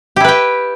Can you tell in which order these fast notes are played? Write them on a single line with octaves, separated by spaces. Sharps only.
G4 E4 B4 G5